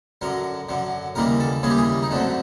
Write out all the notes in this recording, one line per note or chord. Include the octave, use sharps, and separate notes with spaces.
F#2 D3 F#3 A#4
F#2 D3 F#3
D#2 C#3 E3 G3 A#3 A#4
A4
D#2 C#3 E3 G3 A#3 G#4
G4
G#4
D#4
F#2 D3 F#3 A3 C4 D4